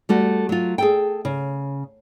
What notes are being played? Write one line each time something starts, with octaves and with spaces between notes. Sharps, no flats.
G3 A3 F#4
F#3 F4
G#4 A4 G5
C#3